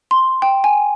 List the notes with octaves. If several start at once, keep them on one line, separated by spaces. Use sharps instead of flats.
C6
G5
G#5